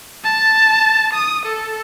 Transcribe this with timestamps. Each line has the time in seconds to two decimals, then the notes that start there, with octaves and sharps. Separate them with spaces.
0.24 A5
1.14 D#6
1.46 A4